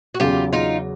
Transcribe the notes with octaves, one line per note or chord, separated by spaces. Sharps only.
F#4
E2 C#3 F#3 F4 G4
D#4 F4